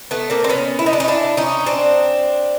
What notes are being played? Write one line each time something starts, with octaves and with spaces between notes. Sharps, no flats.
A3 B3
A#3 C4
C4
B3 C#4
E4
D#4
D4
C#4 D#4
D4 E4
C#4 D#4
C4 D4